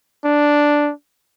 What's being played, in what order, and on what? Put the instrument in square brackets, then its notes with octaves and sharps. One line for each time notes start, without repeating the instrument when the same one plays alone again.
[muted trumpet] D4